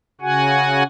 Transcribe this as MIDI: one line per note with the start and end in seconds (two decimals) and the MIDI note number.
0.21 0.83 49
0.21 0.83 66
0.21 0.83 78
0.21 0.83 80